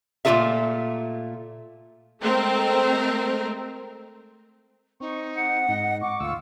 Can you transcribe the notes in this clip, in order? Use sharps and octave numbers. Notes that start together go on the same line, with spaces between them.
A#2 A3 A#3 F4 A4 E5
G#3 A3 C4 A#4
C4 D#4 C#6
F#5 C#7
G#2 D#4 D#5
F#5 C#6 D6
D2 F4 E6